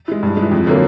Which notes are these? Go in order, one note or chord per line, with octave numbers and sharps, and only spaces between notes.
E3 G#3
G2
G#3
E3
F2
D3 F#3 A#3